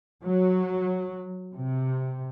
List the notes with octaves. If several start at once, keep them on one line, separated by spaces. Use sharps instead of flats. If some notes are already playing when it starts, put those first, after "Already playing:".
F#3
C3